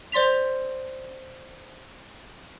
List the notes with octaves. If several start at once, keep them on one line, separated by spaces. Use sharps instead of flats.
C5 D5 C6 B6 F7